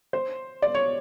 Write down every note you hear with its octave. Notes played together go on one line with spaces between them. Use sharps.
C5
D5
C#5